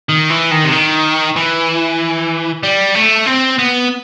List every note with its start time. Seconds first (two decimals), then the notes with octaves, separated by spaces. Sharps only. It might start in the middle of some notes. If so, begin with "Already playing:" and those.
0.09 D#3
0.30 E3
0.51 D#3
0.64 C3
0.72 D#3
1.36 E3
2.63 G3
2.95 A3
3.27 C4
3.59 B3